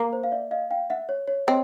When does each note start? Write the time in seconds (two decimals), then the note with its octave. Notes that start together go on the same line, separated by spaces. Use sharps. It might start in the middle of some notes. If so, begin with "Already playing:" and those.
Already playing: A#3
0.13 C5
0.24 F5
0.32 D5 E5
0.51 D#5 F5
0.71 F5 G5
0.90 E5 F#5
1.09 C#5
1.28 C#5
1.47 C4 C#5 D#5